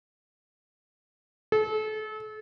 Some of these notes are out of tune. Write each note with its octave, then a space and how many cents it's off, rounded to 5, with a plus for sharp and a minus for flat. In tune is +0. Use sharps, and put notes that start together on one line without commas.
A4 -35